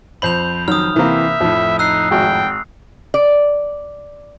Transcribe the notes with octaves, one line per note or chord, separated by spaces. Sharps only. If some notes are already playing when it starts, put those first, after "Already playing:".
F2 C5 B5 G6 F7 F#7
D#3 F#3 D#6 F6
C3 E3 A#3 C4 E5
F2 A2 F3
D#4 E6 F#6 C7
G#1 F#4 G5
D5